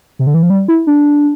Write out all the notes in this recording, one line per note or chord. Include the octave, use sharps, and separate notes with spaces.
C3
D3
E3
F3
G3
E4
D4